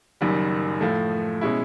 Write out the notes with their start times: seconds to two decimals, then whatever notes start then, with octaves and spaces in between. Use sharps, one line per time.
0.21 F#1 F#2 D#3 G3
0.81 A2 F3 A3
1.41 B2 G#3 C#4 E4